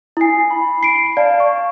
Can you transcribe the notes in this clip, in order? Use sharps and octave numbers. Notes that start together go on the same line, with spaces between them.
E4 G#5 D#6 C7
B5
C7 D7
D5 F5 A5
C#6